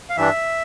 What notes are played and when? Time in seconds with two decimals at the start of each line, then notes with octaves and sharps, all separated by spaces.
0.10 F5
0.17 G2 E3 G3 D4 E5